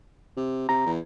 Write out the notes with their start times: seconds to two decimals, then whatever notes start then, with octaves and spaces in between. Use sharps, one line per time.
0.37 C3
0.69 C3 A#5
0.86 E2